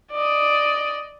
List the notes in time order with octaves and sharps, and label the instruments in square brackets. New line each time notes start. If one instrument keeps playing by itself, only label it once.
[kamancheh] D5 D#5